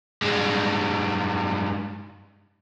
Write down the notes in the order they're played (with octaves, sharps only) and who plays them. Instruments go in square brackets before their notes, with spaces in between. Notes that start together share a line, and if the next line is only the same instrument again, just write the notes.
[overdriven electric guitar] G2 G#3